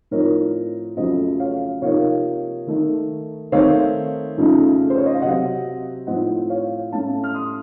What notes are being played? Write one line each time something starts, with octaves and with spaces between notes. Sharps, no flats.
A2 F3 C4 D#4 A#4 C#5
F2 C#3 F#3 A3 C5 D#5
C#5 F5
C3 F3 A#3 D#4 C#5 F5
D#3 A3 D#4
D#3 A3 C4 D#4 C#5 F5
F2 C#3 A3 D#4
C5
C#5
D#5
F5
C3 F#3 C4 D#5 F#5
A2 F3 C4 D#4 D#5 F#5
C#5 F5
A2 A3 C#4 F5 A5
F6
C6 D#6